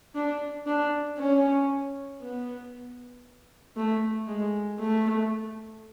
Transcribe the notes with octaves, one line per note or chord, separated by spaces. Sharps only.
D4
D4
C#4
B3
A3
G#3
A3